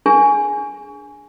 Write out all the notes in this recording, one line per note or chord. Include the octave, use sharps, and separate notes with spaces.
D4 G#4 G#5